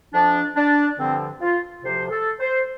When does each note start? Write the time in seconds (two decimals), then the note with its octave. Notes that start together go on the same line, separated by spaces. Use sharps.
0.13 F2 F3 D4
0.55 D4
0.97 G2 D3 F3 C4
1.41 F4
1.83 D2 C3 F3 C5
2.11 A4
2.39 C5